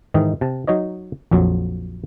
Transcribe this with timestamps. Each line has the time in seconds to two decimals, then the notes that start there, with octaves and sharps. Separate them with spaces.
0.14 G#2 D#3 E3 D#4
0.41 C3 A5
0.67 F#3 D#4 C#5 D#5
1.31 A#1 F2 F#3